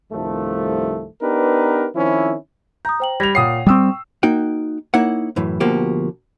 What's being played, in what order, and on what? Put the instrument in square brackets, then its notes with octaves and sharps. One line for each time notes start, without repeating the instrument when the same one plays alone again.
[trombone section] C2 G2 D#3 F3 A3
B3 D4 D#4 G4 A#4 B4
D#3 F3 C4 C#4 E4
[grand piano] A#5 [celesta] D#6 G6
[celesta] C5 G5 F#7
[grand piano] G3 F7 [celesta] G6 G#6 A#6
[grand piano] A#2 D#6 C7 [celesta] C#5 F#5 G5
[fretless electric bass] G3 C4 [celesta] G5 C#6 [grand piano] D#6 E6
[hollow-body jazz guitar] A#3 D#4 F#4 G5
A#3 D#4 E4 C#5 F#5
F#2 A2 E3
D2 B2 F3 A#3 F#4 G4